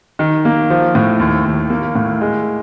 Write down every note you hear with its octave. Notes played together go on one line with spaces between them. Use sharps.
D#3
A#3
F3
A2
D#2
D#2
A#3
A2
G#3